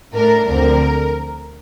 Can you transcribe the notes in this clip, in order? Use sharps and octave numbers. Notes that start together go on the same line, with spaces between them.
A2 A3 D4 A#4
D2 D3 F3 C4 A#4